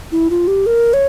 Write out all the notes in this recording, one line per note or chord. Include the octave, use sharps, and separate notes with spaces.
E4
F4
G4
A#4
C#5